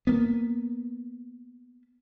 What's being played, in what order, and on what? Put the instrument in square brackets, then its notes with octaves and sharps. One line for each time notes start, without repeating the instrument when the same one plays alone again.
[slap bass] A#3 B3